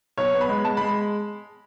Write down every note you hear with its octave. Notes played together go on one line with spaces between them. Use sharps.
B1 C#5
B3
B5
G#3
G#3 A5
G#3 B5